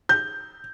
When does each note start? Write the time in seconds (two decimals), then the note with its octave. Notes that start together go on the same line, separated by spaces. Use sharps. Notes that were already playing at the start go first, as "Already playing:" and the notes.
0.09 G6